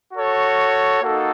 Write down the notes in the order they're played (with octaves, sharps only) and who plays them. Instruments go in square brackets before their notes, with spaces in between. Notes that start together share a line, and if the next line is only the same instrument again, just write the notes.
[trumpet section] F#4 A4 C#5
A#3 D#4 F#4 A4